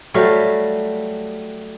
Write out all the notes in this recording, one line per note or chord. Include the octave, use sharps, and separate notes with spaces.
F#3 G3 A3 F5